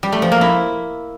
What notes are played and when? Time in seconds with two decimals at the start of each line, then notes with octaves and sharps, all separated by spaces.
0.03 G3
0.13 A3
0.22 F3
0.32 A#3
0.41 E4